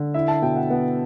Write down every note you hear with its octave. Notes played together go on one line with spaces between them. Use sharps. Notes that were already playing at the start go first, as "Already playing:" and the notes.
Already playing: D3
E4 E5
A5
B2 G5
F#5
B3 F#5